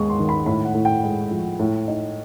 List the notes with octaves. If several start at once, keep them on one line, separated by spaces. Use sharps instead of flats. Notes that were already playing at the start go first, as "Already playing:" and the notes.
Already playing: D#2 G#3 B3 C#6
C6
D#3
B5
A2 B5
F#5
A2
G5
G#3
F3
A2
D#4